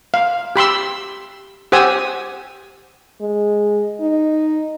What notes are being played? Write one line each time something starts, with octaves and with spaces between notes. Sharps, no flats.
F5
G4 B5 C6 E6
G4 C5 F#5 G#5 D#6 E6
G#3
D#4